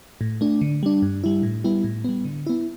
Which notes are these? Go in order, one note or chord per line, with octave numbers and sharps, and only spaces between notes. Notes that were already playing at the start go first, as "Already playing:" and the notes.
A2
A3 D4
D3
G3 D4
G2
G3 E4
A2
G3 B3 E4
A2
G3 B3
D3
B3 E4